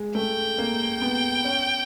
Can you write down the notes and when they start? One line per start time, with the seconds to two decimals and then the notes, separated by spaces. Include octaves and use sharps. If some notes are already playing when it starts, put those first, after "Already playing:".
Already playing: G#3
0.15 A3 G5
0.58 A#3
1.02 B3
1.44 C#4